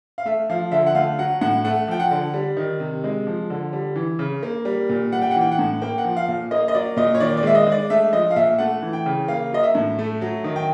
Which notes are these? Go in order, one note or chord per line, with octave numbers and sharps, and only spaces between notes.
F5
A3 E5
F3 F5
D3 E5
F#5
A3 F5
F#3 F#5
A2 F#5
A3 F#5
F3 G5
F#5
D3
G3
D#3
C3
G#3
F3
D3
G3
E3
C#3
A#3
G3
A#2
G3 F#5
G5
E3 F#5
G5
F#5
A2
A#3 G5
F#5
F3
F5
A#2
A#3 D#5
D#5
F#3 D5
A#2 D#5
C#5
D#3 D5
D5
G#3 E5
D#5
G#3 D5
A3 E5
F3 D#5
F5
A#2 E5
A3 F#5
E3
G5
C#3
A#3 F5
F#3 D#5
E5
A2
A3
F#3
D#3
G5